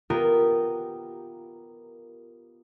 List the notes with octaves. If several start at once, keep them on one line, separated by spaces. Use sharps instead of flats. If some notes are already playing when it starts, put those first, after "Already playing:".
B3 F4 G4 A#4 D#5 G5